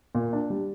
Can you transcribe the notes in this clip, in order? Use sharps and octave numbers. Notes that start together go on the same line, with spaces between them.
A#2
D4
G3